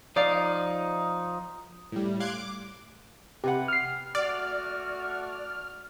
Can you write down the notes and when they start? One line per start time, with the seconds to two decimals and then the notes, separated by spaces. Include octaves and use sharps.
0.16 F3 D#4 D5 F5
1.92 A2 G3
2.20 F5 C6 D6 F#6 G#6
2.32 D6
3.44 C3 G4 B4 F#5
3.68 F6 C7
4.15 A3 F#4 D5 F6